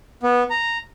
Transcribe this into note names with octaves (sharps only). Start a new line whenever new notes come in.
B3
A#5